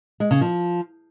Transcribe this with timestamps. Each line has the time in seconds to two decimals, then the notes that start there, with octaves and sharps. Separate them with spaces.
0.20 G#3
0.31 C#3
0.41 F3